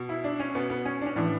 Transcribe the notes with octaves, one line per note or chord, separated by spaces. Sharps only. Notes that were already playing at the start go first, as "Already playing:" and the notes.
Already playing: B2
E4
D4
C#4
B2 B3
B3
C#4
D4
C#4
A2 E3 D4